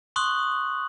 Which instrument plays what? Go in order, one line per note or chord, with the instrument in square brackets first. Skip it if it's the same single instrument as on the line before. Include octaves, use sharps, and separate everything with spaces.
[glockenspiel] C6 C#6 D#6 F#6 F#7